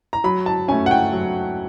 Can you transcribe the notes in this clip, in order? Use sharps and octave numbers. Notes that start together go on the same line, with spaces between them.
A#5
F#3 B5
A5
A3 C#4 G#5
F#5
G5
F#3